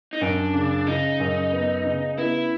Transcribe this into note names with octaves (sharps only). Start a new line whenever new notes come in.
D#4
F#2 D4
C#3
C#3 D#4
F#2
B3
C#3
B3 E4